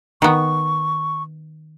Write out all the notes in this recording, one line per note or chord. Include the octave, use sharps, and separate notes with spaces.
D#3 B3 C#6